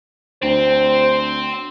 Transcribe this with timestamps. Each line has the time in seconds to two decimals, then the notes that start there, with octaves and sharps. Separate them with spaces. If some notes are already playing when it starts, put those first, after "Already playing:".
0.43 D2 C4 C5